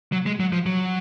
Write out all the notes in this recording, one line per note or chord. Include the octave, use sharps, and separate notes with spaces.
F#3
G#3
F#3
F3
F#3